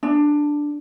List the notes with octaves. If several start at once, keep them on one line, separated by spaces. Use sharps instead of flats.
D4